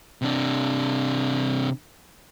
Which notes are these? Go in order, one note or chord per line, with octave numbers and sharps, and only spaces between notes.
C3 D4